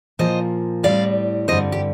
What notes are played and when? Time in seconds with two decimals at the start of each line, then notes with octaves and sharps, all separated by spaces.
0.19 A#2 F3 A#3 C5 D#5
0.83 A2 G3 C4 D5 F5
1.48 G2 D3 G3 C4 C5 D#5
1.72 G4